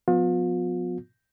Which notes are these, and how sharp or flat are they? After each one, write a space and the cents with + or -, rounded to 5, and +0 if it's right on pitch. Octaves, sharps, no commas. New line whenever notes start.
F3 +40 B3 +20 F4 +40